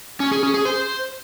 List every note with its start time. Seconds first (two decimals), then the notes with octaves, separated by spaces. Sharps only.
0.20 C#4
0.31 G#4
0.43 C#4
0.54 G#4
0.65 C5